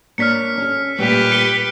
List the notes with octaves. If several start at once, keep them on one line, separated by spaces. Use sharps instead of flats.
A#3 D4 C#5 F6 B6 C#7
C#4 A4
A#2 G3 A3 G4 B4
C#7 G7